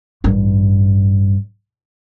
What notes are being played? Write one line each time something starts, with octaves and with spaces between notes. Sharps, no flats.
A1 G2